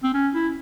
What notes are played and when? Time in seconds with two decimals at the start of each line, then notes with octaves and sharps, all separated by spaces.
0.03 C4
0.14 C#4
0.34 E4